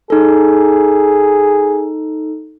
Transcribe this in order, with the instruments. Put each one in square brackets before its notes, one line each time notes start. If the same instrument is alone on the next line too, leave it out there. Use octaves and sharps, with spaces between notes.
[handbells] D#4 A4 [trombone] G#4